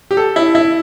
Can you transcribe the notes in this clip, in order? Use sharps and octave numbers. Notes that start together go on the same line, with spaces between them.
G4
A4
E4
E4